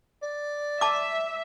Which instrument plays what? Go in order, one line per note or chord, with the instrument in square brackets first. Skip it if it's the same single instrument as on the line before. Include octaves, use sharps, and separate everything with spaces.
[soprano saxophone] D5
[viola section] E5 [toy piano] A5 D6